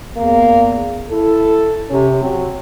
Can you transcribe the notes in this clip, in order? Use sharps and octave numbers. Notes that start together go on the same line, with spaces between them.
E2 A#3
E4 A4
C3 C#4
F#3 C4